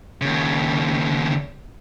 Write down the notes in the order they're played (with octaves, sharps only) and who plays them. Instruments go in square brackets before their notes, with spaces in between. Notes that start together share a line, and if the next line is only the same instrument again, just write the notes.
[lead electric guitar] D#2 C#3